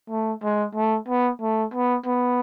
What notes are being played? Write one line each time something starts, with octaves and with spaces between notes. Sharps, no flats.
A3
G#3
A3
B3
A3
B3
B3